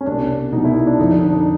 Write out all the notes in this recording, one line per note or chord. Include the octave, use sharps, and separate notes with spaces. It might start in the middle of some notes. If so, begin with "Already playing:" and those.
C#4
C2 B2 D4
C2 B2 D#4
E4
D4
F2 D3 F3 D#4
D4
D4
D#4